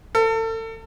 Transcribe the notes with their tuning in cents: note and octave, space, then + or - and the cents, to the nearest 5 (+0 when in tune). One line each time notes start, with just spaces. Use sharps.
A4 +35